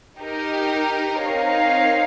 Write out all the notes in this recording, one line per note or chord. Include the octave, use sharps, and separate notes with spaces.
D#4 G4 A#4
C4 D#4 A#4 C#5 F5